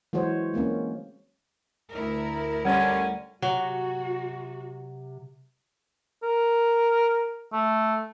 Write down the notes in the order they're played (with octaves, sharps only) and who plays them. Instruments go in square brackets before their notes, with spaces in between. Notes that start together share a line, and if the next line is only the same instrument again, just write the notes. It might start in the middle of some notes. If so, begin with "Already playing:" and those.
[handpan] E3 F#3 G#3 F#4 C5 C#5
G#3 A#3 C4 C#4
[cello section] D2 E4 A#4
[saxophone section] D3 C#4 [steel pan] G3 [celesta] F#5
[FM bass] C3 [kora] F#3 [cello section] F#4
[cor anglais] A#4
A3